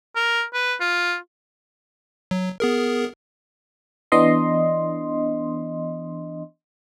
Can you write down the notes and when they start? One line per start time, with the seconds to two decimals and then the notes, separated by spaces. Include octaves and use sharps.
0.15 A#4
0.54 B4
0.80 F4
2.31 F#3
2.60 B3 G#4 A#4
4.12 E3 B3 D4 D#5 C6